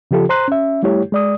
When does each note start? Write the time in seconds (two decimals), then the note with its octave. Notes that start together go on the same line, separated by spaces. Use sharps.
0.11 C#3 F3 F4 G4 A4
0.29 C5 A#5 C6 F#6
0.48 C#4 E5
0.83 G3 A3 E4 G4 C#5
1.12 G#3 D5 D#6